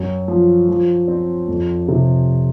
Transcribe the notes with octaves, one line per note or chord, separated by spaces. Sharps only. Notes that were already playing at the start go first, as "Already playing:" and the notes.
Already playing: F#2
F3
F3
C4
F2
C3